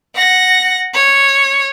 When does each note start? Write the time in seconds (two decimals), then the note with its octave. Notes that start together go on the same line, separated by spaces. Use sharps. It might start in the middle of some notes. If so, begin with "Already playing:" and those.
0.15 F#5 A#6
0.93 C#5